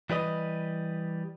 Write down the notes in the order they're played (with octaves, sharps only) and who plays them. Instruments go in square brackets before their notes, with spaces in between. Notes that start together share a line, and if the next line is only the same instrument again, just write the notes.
[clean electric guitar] E3 G3 B4 D#5